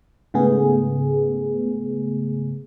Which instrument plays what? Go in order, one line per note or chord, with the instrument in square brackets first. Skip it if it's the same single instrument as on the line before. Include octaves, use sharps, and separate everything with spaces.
[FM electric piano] G#2 C#3 A3 B3 G#4